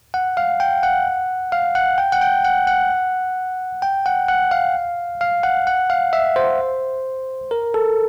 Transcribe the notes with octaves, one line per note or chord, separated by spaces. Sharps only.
F#5
F5
G5
F#5
F5
F#5
G5
F#5
G5
F#5
F#5
G5
F#5
F#5
F5
F5
F#5
F#5
F5
E5
C5
A#4
A4